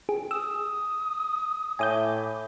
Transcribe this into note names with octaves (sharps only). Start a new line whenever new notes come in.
G#4 G5
D#6 E6
A2 G#5 D6 D#6 G6